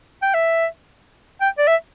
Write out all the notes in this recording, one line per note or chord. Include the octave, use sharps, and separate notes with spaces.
G5
E5
G5
D5
E5